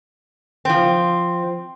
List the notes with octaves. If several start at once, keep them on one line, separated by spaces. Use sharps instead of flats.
F3 C4